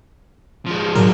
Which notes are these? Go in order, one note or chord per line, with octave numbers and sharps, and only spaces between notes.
F3 G#3
G#2 F#3 A#4